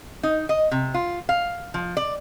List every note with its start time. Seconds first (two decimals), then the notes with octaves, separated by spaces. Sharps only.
0.23 D#4
0.49 D#5
0.71 C3
0.94 F4
1.29 F5
1.74 F3
1.97 D5